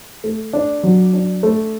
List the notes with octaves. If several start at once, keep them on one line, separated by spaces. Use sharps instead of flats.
A3
D4
F#3
D4
A3